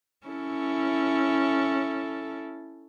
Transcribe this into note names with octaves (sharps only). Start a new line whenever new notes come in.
C#4 E4 A4